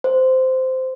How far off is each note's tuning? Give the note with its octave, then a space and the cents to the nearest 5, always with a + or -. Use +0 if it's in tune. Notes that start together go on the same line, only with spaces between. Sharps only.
C5 -10